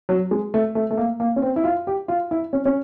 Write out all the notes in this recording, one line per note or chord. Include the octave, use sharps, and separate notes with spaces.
F#3
G#3
A3
A3
A3
A#3
A#3
C#4
C4
E4
F4
G4
F4
E4
C#4
C#4